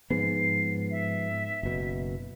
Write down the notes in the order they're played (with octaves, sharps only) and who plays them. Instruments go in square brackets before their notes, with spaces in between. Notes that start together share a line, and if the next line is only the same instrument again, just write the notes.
[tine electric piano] G#2 [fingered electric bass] F3 G#3 B3 [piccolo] C7
[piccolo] E5
[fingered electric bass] F#1 B2